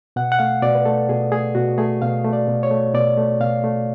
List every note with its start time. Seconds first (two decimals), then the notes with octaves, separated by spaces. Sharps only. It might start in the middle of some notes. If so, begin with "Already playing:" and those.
0.16 B2 F#5
0.32 F#5
0.39 A3 F5
0.62 B2 D5
0.75 B4
0.86 A3 A4
1.09 B2 G#4
1.32 A3 G#4
1.55 B2 F#4
1.78 A3 G#4
2.02 B2 F5
2.24 A3
2.33 D5
2.48 B2
2.63 C#5
2.71 A3
2.94 B2 D5
3.18 A3
3.40 B2 F5
3.64 A3